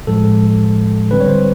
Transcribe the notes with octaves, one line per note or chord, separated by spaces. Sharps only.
A2 F3 G#3 A4
D3 G3 C4 B4
C#5
C5